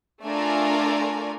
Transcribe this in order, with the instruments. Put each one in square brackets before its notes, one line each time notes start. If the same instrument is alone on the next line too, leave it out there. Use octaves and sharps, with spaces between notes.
[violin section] A3 D4 F4 A#4 D5 G#5